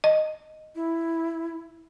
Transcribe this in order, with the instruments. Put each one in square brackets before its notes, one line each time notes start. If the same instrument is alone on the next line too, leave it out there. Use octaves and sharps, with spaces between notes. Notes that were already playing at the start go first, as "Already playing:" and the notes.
[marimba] D#5
[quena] E4